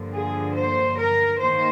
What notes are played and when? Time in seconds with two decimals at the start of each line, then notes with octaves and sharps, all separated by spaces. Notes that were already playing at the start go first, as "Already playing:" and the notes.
Already playing: G2 D3 F3 A#3
0.14 G#4
0.57 C5
0.98 A#4
1.41 D#3 A#3 C5